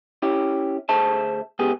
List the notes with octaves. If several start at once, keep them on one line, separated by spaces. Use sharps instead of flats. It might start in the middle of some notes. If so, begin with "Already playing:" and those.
C#4 E4 G4
D2 G#4 C5 E5 A5
C#2 B3 G4 G#4